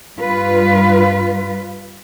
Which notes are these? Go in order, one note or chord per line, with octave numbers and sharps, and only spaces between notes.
G2 F4 B4